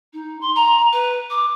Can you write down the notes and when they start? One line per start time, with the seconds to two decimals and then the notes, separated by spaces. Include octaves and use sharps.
0.13 D#4
0.41 C6
0.55 A#5
0.93 B4
1.30 D6